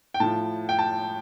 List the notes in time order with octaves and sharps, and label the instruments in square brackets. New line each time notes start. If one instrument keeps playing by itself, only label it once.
[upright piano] G5
A2 F3 A5
G5
A5